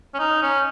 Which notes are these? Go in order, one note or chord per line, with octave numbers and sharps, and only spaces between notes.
C#4
D#4
C#4